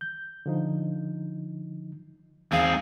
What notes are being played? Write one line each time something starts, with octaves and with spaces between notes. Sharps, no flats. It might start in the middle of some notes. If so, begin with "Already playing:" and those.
G6
D3 F3 D#4
E2 G#2 C4 G#4 F5